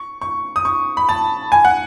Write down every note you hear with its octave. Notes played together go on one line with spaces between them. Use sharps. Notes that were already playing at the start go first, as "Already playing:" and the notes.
Already playing: C#6
C#6
D#6
C#6
B5
A5
G#5
F#5